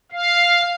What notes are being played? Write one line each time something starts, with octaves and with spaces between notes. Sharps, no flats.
F5